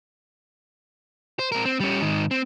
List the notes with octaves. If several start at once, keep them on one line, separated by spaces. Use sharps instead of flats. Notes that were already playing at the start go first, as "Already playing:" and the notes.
C5
C4 A#4
C4
G3 C#4
G#2 D#3
C4